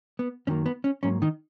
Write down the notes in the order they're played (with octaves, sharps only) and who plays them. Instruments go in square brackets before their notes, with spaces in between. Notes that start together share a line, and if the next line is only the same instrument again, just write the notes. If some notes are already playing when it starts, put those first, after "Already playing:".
[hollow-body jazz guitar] B3
F#2 D#3 F#3 A#3 C#4
B3
C#4
G#2 F#3 A#3 C#4
D#3 D#4